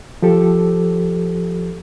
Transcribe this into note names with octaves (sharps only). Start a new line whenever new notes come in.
F3 G4 A4